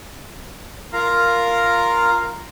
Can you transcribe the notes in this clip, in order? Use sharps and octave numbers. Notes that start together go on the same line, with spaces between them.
F4 A#4 F5 A#5